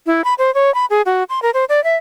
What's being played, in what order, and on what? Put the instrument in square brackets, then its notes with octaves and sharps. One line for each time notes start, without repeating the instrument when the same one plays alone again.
[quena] E4
B5
C5
C#5
B5
G#4
F#4
C6
A#4
C5
D5
E5